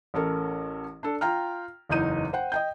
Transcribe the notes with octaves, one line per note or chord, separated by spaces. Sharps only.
A1 C#4 A4 A#4
D4 A4
F4 G5 A#5 F6
F#1 E2 E3 D#4 G6 D#7
C5 F#5 G5
D#5 G5 G6